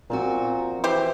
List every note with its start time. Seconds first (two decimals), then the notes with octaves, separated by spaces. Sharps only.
0.10 A#2 F3 C4 F#4
0.84 E3 G4 C5